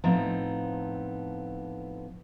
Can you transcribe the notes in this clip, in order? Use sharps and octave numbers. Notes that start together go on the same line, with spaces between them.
A2 F3 B3 C4 D#4 A#5